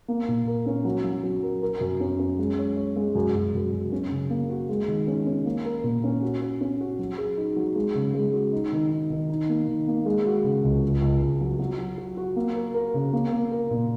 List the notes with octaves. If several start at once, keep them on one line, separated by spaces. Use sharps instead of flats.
A#3
A#2
A#4
C#4
F#3
F#3
F#3
A#4
A#4
F#2
C#4
C#4
G#3
C#5
C#5
G#3
F#2
F#2
F#2
F#2
C#4
C#3
A#3
F#4
G#3
D#3
C#4
C#4
A#3
A#4
A#2
C#4
F#4
F#4
C#4
F#4
F#3
G#4
D#4
F#3
G#3
C#3
G#3
F#4
D#4
D#3
D#4
D#3
D#4
A#3
D#3
A#3
G#3
F#4
C#3
C#2
C#2
C#2
C#2
F#3
F#3
F#4
F#4
F#4
A#3
A#4
A#4
C#3
A#3
A#3
A#4
A#2